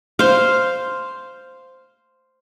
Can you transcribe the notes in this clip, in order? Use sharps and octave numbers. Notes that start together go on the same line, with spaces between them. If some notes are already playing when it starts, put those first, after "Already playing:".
C5 F5